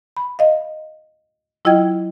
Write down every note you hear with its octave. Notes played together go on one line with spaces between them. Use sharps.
B5
D#5 F5
F#3 E4 F4 D#5 G5 G#6